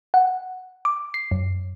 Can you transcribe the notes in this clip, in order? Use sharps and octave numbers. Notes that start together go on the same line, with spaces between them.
F#5
D6
C7
F#2